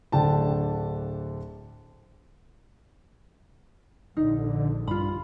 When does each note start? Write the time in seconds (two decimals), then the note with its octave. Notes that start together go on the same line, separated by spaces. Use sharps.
0.12 D1 D3 G5 A5
4.17 A#1 D3 D#4
4.87 G2 F4 B5